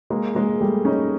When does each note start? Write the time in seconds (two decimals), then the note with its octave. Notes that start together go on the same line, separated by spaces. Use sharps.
0.10 G#3 A#3
0.35 G#3 A#3
0.61 G3 A3
0.85 C#4 D#4